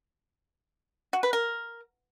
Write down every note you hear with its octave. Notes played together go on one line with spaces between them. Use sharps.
F#4
B4
A#4